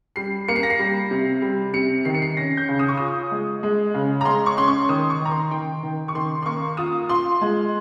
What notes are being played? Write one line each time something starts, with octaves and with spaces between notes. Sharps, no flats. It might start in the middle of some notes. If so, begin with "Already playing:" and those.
G3 C7
A#3 C#7
C7
A#6
C7
G3
C3
G3
C3 C#7
D#3 C7
C#7
C7
C#4 A#6
G6
C#3
D#6
C#6
F4 D#6
G#3
G#3
C#3
A#5
G#3 C6
C#6
C#4 C6
C#6
D#3 D#6
C#6
D#3 A#5
C6
D#3 G5
D#3
C#6
D#3 C6
C6
A#3 C#6
F4 D#6
F4 C6
G#3